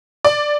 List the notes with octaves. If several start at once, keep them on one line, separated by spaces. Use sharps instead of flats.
D5